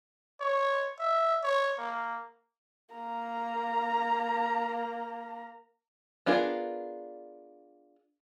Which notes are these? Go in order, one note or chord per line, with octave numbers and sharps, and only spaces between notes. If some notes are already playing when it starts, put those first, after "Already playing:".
C#5
E5
C#5
A#3
A#3 A#5
B3 D4 F4 G#4 A#4